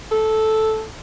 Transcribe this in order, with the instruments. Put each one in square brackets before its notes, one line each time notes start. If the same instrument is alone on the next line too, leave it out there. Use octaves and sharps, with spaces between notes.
[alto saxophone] A4